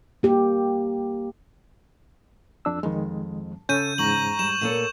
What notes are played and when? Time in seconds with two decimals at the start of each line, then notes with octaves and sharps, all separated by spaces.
0.23 A#3 G4
2.65 F2 D4 E6
2.83 F2 D#3 G#3
3.69 C#3 C#4 A4 G6 D#7
3.98 E2 G#2 A#5 C#6 F#7
4.39 G3 E7
4.61 A#2 A#3 A4 C#5